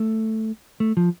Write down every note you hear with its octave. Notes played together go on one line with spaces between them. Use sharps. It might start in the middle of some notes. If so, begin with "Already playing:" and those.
Already playing: A3
A3
F3